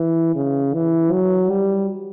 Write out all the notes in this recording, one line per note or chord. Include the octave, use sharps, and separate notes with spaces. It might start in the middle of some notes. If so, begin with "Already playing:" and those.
Already playing: E3
C#3
E3
F#3
G3